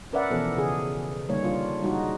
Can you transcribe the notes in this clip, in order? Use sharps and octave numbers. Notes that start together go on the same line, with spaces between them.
C#4 A#4 B4 D5 E5 F#5
B2 E3 F3 B3 A4
C#3 G#4
D3 G3 A#3 D#4 C#5
G3 D4 F4
G3 G#3 D#4 F#4